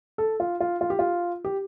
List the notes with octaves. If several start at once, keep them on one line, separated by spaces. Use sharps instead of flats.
A4
F4
F4
F4
G4
F4
G4